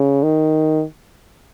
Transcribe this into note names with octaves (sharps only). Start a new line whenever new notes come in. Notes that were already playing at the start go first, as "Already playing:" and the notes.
Already playing: C#3
D#3